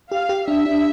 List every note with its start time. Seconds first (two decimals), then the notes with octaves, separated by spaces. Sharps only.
0.12 G4 F5
0.29 G4
0.47 D4 E5
0.66 D4